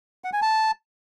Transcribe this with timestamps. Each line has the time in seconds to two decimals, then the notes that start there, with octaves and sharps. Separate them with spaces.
0.24 F#5
0.33 G#5
0.42 A5